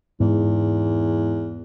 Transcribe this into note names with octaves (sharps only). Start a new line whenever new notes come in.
E2 G#2